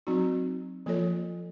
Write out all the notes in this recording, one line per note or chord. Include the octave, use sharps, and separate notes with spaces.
F#3 C4 D#4 F#4
F3 A#3 F4 A4 C#5